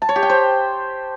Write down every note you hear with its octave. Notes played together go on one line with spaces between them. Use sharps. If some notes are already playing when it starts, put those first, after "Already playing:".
A5
C#5
G4
G5
C5